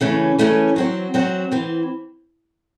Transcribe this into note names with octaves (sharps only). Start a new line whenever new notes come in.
C#3 E3 A3 C#4
C#3 E3 A3 C#4
F#3 C4 F#4
F#3 C4 F#4
E3 C4